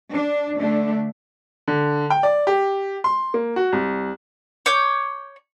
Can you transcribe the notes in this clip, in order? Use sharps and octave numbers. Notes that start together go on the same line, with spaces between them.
D4
D3 A3 D4
D3
G5
D5
G4
C6
A#3
F#4
C2
C#5 D6 G6